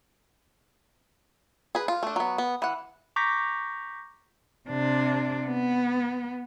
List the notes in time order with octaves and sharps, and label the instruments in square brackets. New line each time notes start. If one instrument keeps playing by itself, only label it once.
[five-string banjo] G#4 B4
F4
A3 D4
F#3 B3
B3
E3 F#5
[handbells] A#5 C#6 D6 G6 A#6 B6
[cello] C3 D4
B3